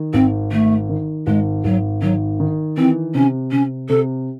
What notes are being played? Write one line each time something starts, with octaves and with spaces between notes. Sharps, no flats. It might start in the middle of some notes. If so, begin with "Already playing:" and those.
Already playing: D#3
G#1 C4
D#3 A3
D#3
G#1 G#3
G#1 F#3
D#3 F#3
D#3
E3 C4
C3 C#4
C3 C#4
C3 A4